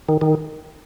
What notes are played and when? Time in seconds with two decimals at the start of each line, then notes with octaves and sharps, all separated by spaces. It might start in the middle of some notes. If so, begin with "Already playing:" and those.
0.09 D#3
0.21 D#3